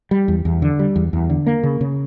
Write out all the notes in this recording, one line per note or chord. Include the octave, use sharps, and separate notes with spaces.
G3
E2
E2
D3
G3
E2
E2
D3
A#3
C#3
C#3